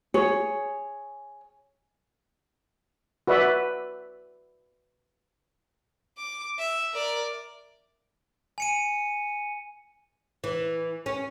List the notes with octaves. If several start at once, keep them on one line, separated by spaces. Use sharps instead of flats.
G#4 C#5
F#4 B4 D5 E5
D6
E5
A#4 D5
G#5 C#7 D#7
E3
C#4